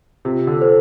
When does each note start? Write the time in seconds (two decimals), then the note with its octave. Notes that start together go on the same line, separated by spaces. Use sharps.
0.25 C3 F4
0.47 D3
0.59 A4 C5